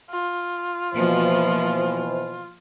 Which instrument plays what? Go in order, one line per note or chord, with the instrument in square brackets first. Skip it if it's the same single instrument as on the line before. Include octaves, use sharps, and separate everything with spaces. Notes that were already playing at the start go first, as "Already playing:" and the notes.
[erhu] F4
[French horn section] B2 E3 C5 [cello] F3 A#3